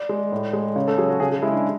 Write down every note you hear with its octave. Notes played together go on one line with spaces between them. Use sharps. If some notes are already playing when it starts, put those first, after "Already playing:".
Already playing: D5
G#3
A2
G#3
C#3 C#5
A4
F#3 G#4
F#4
C#3 G#4
G#4
G#3 E4
D4